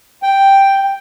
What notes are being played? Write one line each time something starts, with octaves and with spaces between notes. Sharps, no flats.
G5